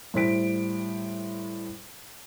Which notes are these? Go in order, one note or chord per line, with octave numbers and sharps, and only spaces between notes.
A2 G3 C5 B6 D7